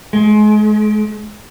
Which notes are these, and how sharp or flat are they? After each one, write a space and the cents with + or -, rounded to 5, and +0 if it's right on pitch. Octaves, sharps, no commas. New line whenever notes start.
G#3 +35